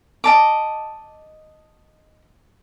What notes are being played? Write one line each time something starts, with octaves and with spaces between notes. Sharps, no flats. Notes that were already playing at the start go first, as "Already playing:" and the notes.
D#5 A5 D6